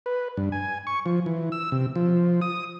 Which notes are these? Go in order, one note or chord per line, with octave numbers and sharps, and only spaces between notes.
B4
G2
G#5
C#6
F3
E3
E6
C3
F3
D#6